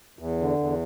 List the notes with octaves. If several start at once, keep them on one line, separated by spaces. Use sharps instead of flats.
E2
D3
E2